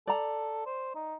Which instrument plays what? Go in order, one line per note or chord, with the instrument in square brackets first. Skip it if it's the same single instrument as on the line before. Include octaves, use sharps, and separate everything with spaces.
[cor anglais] A4 [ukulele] D5 A#5
[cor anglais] C5
D#4